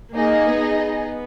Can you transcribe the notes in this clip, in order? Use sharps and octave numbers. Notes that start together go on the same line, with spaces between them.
A#3 D#4 G#4 D#5
B3